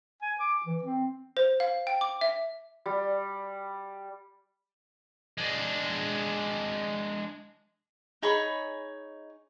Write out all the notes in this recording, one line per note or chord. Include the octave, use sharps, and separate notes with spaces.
G#5
D6
E3
C4
C5
F5
G5
D6
E5
G3
G#3 D4
D#4 G#4 C#5 B5